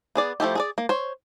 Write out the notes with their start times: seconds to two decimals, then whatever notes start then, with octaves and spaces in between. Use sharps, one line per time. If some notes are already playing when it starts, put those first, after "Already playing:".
0.15 B3 G#4 D5
0.40 F3 A3 E4 G4
0.55 G#4 A4 D5
0.78 A#3
0.89 C5 C#5